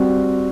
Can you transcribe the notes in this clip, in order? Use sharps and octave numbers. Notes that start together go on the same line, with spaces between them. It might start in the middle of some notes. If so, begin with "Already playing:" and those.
Already playing: G3 C4 F#4